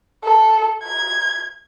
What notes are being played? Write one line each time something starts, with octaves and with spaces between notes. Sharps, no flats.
A4
G#6